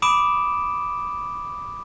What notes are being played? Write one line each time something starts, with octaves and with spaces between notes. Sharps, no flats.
B5 D6 D#6 D7 E7